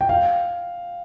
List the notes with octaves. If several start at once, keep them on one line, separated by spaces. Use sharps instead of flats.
G5
F5